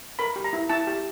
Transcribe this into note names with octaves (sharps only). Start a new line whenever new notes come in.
A#4 B5
G4
A#5
E4
E4 A5
G4